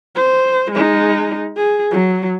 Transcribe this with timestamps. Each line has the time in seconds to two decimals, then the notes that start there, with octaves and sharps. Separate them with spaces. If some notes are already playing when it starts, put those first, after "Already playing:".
0.15 C5
0.71 G#3 D#4
1.57 G#4
1.91 F#3